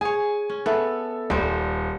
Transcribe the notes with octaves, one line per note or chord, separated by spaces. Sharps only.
G#4 C#5 G#5
C#4
B3 A4 E5
D#1 G3 C5